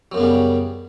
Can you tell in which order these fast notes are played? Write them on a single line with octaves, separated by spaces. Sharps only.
F#3 F#2 B3 C#3 G3